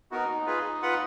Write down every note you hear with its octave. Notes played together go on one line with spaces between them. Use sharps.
B3 D#4 F#4 A#4
F4 G#4 B4
F4 B4 F#5